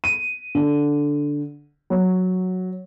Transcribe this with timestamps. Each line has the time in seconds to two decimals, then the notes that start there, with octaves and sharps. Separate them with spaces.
0.04 D#7
0.55 D3
1.90 F#3